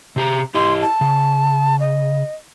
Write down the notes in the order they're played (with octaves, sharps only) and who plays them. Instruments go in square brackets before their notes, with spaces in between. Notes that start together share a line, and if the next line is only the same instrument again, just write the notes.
[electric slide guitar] C3 G4 A#5
[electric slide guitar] E4 G4 D#5 [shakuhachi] C6
[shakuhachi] A5
[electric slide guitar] C#3
[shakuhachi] D#5